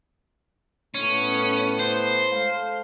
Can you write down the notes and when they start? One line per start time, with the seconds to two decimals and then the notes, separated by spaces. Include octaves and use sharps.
0.94 A2 B3 C#4
1.79 C5
2.30 G#3 A4 F5